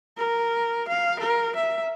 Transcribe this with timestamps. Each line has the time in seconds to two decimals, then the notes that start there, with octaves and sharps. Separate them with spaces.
0.17 A#4
0.88 F5
1.20 A#4
1.55 E5